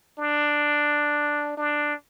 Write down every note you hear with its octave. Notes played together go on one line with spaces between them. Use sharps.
D4
D4